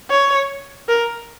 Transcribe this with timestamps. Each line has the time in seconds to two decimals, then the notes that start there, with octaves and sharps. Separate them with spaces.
0.11 C#5
0.88 A#4